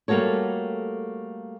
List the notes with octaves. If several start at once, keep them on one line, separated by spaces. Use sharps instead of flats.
G3 A3 A#3 F#4 A4 C#5